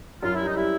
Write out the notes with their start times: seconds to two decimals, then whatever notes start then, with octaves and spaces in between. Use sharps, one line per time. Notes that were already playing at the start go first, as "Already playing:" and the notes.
0.23 F#2 F4
0.34 G3 E4
0.45 D#4
0.55 G3 E4